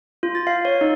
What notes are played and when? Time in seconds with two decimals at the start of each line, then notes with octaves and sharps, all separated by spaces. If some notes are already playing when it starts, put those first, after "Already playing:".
0.23 F4
0.35 A6
0.47 F5
0.65 C#5
0.81 D#4